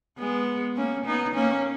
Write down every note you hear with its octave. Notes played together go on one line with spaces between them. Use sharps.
G#3 B3
A#3 C#4
B3 D#4
A#3 C#4